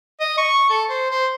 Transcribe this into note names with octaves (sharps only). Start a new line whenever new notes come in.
D#5
C#6
A4
C5
C5